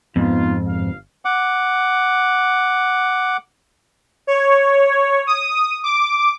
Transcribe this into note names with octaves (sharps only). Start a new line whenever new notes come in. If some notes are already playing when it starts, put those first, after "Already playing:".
F2 G#2 B3 D#4 F4
G1 F5
F#5 D6
C#5
D#6
D6